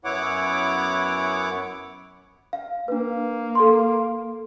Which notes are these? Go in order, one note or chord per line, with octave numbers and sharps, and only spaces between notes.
F#2 B3 E4 C#5 F#5 D6
F5
A#3 D4 B4
A4 C6